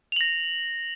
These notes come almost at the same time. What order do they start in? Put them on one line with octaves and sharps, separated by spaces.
F7 F#7 A#6